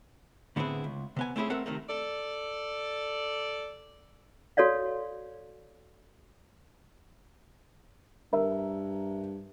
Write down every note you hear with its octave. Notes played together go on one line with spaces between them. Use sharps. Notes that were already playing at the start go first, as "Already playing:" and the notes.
A2 D3 B3 C4 E4 G#4
C#2
C3 B3 G#5
A3 C4 C#4 E4 G4 G#4
A3 C4 A4 A#4 E5 F#5
C3 D#3 A3 A#3
A4 D5
F#4 A4 C#5 D5 F5
G2 A#4 E5